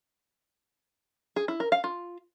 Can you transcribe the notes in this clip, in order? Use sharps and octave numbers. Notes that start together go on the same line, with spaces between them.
G#4
E4
A#4
F5
F4